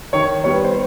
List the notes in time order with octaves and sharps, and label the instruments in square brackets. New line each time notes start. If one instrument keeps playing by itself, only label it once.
[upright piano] D#3 [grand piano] C#5
[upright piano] G3 B3 [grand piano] C#5
[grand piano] C5